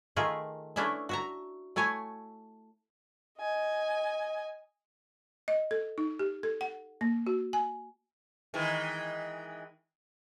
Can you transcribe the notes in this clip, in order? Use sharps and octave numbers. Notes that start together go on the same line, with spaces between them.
D#3 A3 F4 G#4 A#4 E5
A3 C#4 D4 E4 B4 E5
F#4 E5 A#5
A3 E4 C#5 G#5
D#5 G#5
D#5
A4
D#4
G4
A4
F#5
A#3
F#4
G#5
D#3 E3 G#3